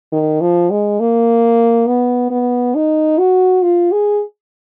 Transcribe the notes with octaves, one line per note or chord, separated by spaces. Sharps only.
D#3
F3
G#3
A#3
B3
B3
D#4
F#4
F4
G#4